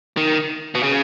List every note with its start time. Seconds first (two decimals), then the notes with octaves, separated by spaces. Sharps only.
0.17 D#3
0.75 B2
0.83 C#3